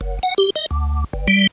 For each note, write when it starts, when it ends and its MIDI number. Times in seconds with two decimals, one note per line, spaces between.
0.01 0.19 30
0.23 0.35 78
0.38 0.50 67
0.56 0.66 75
0.71 1.04 38
1.13 1.27 31
1.28 1.47 55